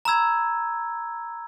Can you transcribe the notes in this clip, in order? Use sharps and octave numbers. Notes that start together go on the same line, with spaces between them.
A#5 B5 E6 G#6